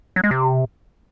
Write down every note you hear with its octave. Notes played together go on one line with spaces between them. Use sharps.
F#3
G#3
C3